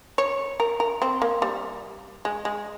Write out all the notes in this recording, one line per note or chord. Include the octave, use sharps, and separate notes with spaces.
C#5
A#4
A#4
C4
A#3
G3
G#3
G#3